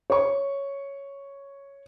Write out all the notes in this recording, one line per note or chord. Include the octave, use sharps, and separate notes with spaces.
C#5 C#6